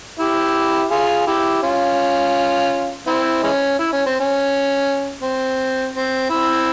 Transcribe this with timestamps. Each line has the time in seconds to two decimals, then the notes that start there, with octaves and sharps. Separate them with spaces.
0.19 E4 G4
0.91 F4 G#4
1.27 E4 G4
1.63 C#4 F4
3.07 C4 E4
3.43 E3 G#3 C#4
3.79 E4
3.93 C#4
4.06 C4
4.20 C#4
5.22 C4
5.94 C4
6.30 C4 E4